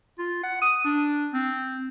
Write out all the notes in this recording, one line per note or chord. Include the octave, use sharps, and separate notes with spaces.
F4
F#5
D#6
D4
C4